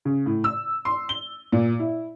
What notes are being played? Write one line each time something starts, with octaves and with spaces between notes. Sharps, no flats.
C#3
A2
E6
C6
G7
A#2
E4